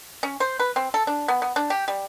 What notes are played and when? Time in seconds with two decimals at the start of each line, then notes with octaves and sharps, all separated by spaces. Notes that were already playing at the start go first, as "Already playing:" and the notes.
0.23 C#4
0.40 C5
0.60 B4
0.76 C4
0.94 A4
1.07 D4
1.28 B3
1.42 B3
1.56 D4
1.70 G4
1.88 G3